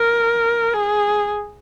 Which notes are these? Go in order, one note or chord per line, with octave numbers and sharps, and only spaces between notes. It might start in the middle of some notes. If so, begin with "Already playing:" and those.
Already playing: A#4
G#4